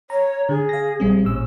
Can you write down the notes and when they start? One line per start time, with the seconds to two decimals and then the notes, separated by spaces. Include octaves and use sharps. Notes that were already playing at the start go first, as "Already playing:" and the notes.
0.10 C#5 A#5
0.49 D3 G#4
0.69 F5 A#6
1.00 A#1 G3 C4
1.24 A1 A#2 C#4 E6